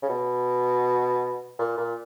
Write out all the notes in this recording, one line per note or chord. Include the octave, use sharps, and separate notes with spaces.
C#3
B2
A#2
A#2